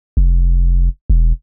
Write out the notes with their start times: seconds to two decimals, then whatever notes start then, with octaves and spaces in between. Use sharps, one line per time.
0.17 F1
1.10 E1